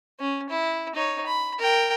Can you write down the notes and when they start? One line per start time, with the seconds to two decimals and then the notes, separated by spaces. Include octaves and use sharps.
0.20 C#4
0.49 E4
0.95 D#4 C#5
1.26 B5
1.59 A#4 G5